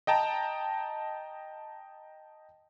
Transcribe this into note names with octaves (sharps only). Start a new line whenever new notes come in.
D#5 G5 A5 A#5